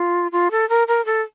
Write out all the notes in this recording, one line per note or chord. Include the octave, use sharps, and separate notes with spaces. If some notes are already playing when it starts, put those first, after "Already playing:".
Already playing: F4
F4
A4
A#4
A#4
A4